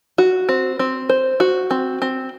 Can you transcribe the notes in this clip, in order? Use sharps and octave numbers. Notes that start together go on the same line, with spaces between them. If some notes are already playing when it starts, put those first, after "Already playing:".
F#4
C4
C4
C5
F#4
C4
C4